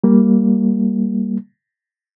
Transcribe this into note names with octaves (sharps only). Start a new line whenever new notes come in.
G3 A#3